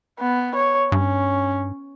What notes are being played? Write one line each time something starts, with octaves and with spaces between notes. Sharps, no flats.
B3
C#5
G2 C#4